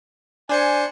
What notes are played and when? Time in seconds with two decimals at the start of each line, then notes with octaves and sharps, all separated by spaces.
0.49 D4 C5 G#5 C#7